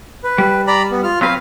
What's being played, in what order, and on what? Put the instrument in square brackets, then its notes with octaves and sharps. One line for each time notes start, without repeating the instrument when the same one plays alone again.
[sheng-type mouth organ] B4
[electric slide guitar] G3
[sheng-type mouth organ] D5 A#5 B5
B3
F4 F6
[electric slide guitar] F#3 C4 B4 [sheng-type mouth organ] F5